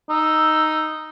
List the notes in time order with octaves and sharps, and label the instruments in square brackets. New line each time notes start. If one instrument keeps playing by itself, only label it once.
[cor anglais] D#4 [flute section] E6